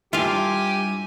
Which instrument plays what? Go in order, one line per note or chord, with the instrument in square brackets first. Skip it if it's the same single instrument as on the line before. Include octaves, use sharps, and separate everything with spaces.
[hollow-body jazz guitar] G2 E4 [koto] F4 F5 [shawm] G4 [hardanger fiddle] G#5